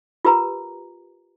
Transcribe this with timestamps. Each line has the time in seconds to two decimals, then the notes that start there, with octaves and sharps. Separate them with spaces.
0.25 F4 G4 A#4 B4 A#5